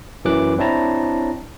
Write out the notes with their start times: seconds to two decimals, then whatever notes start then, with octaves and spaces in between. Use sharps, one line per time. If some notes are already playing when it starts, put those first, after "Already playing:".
0.25 F#2 E3 F#3 D6 F#6
0.58 C4 D4 E4 C#5 A5 A#5